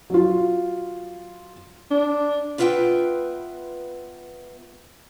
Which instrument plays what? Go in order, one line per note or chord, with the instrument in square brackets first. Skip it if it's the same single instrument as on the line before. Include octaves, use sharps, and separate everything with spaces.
[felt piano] F#3 F4
[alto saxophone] D4
[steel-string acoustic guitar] B3 F4 B4 E5 F5 G5